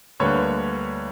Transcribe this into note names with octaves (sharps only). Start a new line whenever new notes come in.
D2 D3 G3 A#3 B4 C#5